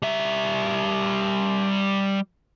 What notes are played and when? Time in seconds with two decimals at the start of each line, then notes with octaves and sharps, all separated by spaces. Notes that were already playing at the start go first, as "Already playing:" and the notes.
0.02 G3 E5